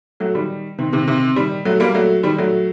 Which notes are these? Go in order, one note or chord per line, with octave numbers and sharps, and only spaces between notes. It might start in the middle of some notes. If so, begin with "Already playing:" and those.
F#3 A3
D#3 G3
C3 D#3
C3 D#3
C3 D#3
D#3 G3
F#3 A3
G3 A#3
F#3 A3
D#3 G3
F#3 A3